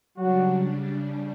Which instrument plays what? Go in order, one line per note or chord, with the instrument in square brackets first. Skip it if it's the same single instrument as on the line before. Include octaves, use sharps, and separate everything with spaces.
[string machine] C#3 G3 D4 [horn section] F#3 F#4